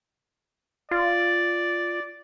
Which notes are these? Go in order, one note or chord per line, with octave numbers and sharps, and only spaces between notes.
F4 D5